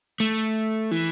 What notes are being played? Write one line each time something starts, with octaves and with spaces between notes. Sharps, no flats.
A3
E3